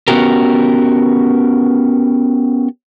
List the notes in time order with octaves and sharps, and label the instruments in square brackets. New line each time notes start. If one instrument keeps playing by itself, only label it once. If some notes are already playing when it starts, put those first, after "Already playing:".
[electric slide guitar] B3 C#4 D#4 F#4 G4 A#4